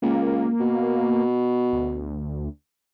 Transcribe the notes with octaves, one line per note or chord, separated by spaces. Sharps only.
C#2 A#3
B2
D2